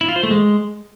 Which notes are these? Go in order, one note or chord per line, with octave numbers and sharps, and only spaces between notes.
E4
F4
C5
A3
G#3